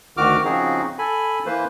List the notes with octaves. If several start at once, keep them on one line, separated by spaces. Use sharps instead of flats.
D2 D#3 F#4 D6 F6
C#3 F3 C4 D#4 F#4 G#4
A4 G#5 B5
E3 A#3 B4 C5